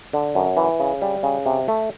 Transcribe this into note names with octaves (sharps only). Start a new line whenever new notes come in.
D3
F#2
E3
C#3
G3
C#3
C3
A3